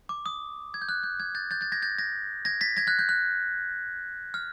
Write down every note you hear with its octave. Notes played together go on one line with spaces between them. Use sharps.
D6
D#6
G#6
G6
F#6
G6
F#6 G#6
G6 A6
G6 A6
G6 A6
G#6 A#6
G6 A6
G#6 A#6
G#6 A#6
A6 B6
G#6 A#6
F#6 G#6
G6
F#6
F6